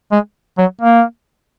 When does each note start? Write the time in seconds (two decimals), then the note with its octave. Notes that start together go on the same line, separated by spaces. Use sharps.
0.11 G#3
0.58 F#3
0.81 A#3